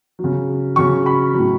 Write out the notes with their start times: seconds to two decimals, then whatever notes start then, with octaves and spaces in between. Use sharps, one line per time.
0.19 F#3
0.24 C#3
0.76 C#3 F#3 C#6
1.06 B5
1.34 A2 F#3